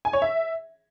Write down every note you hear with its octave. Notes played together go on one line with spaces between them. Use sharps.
G#5
C#5
E5